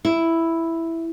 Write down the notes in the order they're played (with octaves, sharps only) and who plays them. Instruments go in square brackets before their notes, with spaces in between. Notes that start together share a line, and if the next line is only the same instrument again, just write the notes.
[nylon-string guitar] E4